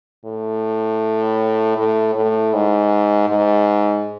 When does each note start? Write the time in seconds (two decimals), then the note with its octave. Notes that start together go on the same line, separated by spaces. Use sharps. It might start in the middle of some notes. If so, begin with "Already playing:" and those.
0.25 A2
1.77 A2
2.15 A2
2.54 G#2
3.28 G#2